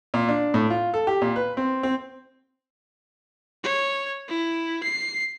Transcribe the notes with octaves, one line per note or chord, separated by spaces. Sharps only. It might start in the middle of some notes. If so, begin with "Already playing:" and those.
A#2
D4
A2
F4
A4
G4
A#2
B4
C4
C4
C#5
E4
C7